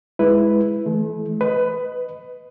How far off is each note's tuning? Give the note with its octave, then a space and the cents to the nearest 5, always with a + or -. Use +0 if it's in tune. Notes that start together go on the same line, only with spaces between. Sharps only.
G#3 +0 E4 +0 B4 +0
E3 +0 A3 -40
B4 +15 D#5 +0